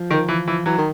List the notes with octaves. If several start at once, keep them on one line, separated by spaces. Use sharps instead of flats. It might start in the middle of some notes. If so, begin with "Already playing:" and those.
Already playing: F3
D#3
E3
E3
E3 F#3
D#3